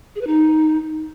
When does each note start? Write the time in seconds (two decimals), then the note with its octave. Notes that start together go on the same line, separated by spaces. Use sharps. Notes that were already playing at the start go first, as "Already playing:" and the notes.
0.15 G#4
0.21 B4
0.27 D#4